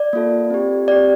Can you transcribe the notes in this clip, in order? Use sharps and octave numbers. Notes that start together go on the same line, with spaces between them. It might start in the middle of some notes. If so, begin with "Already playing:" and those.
Already playing: D5
A#3 F4 A4
C4 G4
C4 G4 D5